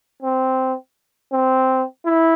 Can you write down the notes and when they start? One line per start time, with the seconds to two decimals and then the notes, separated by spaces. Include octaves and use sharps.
0.22 C4
1.32 C4
2.05 E4